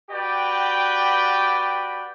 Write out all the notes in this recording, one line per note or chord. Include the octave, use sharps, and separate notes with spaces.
F#4 G4 B4 D5 G5